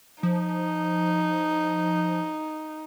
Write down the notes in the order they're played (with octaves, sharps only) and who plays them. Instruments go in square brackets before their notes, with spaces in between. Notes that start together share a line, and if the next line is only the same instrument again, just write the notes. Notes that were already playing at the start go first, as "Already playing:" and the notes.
[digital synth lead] F3 [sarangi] D#4